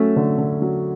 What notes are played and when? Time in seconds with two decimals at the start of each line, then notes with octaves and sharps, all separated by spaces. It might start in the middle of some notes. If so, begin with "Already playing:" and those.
Already playing: F#3 A3 C#4
0.16 D3
0.38 D3
0.62 F#3